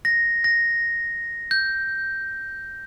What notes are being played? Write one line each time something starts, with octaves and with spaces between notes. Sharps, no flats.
A#6
A#6
G6